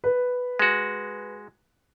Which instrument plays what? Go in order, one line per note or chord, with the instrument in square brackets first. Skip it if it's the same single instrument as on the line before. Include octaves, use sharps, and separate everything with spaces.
[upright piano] B4
[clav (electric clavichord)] G#3 F#4